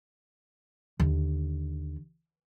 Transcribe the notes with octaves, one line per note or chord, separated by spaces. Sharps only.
D#2 D3